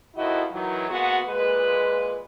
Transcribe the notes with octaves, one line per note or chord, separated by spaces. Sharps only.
F2 D#3 F3 E4 F#4 D#5
D#3 E3 F#3
G#3 A#3 B3 F#4
A#2 G#3 B4